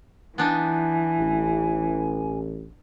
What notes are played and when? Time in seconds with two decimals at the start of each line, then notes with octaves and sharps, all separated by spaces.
0.38 E3 B3 D4 D#4 G#5
1.19 A1